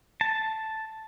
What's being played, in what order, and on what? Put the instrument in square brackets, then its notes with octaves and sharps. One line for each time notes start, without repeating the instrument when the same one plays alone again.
[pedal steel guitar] A5